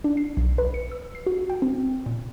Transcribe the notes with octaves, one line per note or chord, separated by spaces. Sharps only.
D4
C7
B1
B4
C#7
E6
C7
F#4
G5
C4
A#2